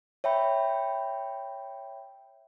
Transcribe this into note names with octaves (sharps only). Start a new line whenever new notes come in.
C#5 E5 G5 B5